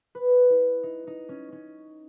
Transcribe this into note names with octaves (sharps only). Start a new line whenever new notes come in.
B4
E4
D#4
D#4
C#4
C#4